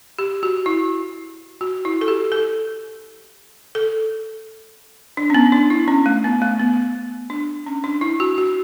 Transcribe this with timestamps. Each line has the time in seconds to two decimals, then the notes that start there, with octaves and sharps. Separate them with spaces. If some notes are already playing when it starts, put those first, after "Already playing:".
0.19 G4
0.43 F#4
0.66 E4
1.61 F#4
1.85 E4
2.01 A4
2.08 G4
2.32 A4
3.75 A4
5.17 D4
5.30 C#4
5.35 B3
5.52 D4
5.70 E4
5.88 C#4
6.06 A3
6.24 B3
6.42 A3
6.60 B3
7.30 D4
7.66 C#4
7.84 D4
8.01 E4
8.20 F#4
8.38 F#4